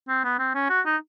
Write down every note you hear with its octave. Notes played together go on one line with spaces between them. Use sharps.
C4
B3
C4
C#4
F#4
D#4